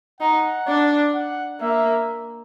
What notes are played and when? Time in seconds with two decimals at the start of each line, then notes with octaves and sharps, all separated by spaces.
0.20 D#4 F#5
0.68 D4
1.14 F#5
1.60 A#3 E5